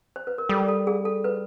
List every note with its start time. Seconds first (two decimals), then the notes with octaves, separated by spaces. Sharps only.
0.16 C5
0.27 B4
0.38 A#4
0.49 G3 A4
0.68 A4
0.87 G#4
1.05 A4
1.24 B4